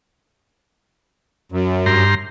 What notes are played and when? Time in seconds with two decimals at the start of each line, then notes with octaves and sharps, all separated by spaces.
1.52 F#2
1.86 G2 A#5 C6